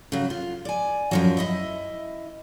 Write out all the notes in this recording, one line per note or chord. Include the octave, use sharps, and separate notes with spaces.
C#3 F#3
F4
D5 G#5
F#2 F3 F#3
E4 D#5 E5